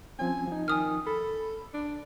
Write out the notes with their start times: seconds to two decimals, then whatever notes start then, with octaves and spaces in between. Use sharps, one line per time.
0.19 F3 C4 C#4 G#5
0.48 F3 D#4
0.68 D#3 G#5 D#6 F6
1.07 A4 B5
1.74 D4